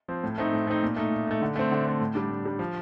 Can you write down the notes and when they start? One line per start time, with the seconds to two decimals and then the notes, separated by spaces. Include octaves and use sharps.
0.08 F3 C4
0.24 A2
0.38 A3 C4 D#4
0.53 A2
0.67 A3 C4 D#4
0.83 A#2
0.96 A3 D#4
1.11 A#2
1.27 A3 D#4
1.42 D3
1.56 A3 C4
1.71 D3
1.86 A3 C4
2.00 A2
2.15 G3 D4
2.30 A2
2.45 G3 D4
2.59 F3